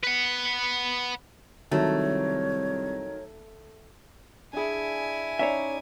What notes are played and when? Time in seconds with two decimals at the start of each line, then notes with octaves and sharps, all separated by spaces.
0.03 B4 F#5
1.71 C2 D#3 F#3 A3 C#5
4.53 D4 E4 G#4 G#5
5.39 C#4 D#4 C#5 D5 E5